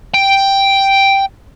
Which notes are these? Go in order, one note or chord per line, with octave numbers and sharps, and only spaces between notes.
G5